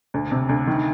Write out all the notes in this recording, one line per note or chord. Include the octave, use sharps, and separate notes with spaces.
D2
C3
D2
D#3